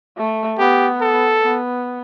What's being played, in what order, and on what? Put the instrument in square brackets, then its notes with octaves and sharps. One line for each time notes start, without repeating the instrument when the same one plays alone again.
[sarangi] A3
[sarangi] B3 [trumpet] G4
[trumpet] A4
[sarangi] B3